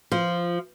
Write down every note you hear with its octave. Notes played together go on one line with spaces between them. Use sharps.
F3